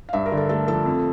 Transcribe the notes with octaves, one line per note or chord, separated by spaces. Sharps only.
F5
G2 E5
A#4
D3
A4
A3 A4
F3 A4
F2